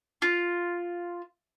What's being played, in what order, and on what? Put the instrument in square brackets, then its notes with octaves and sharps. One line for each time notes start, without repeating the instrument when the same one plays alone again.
[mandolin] F4